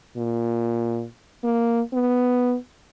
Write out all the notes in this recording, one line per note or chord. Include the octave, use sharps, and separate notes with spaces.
A#2
A#3
B3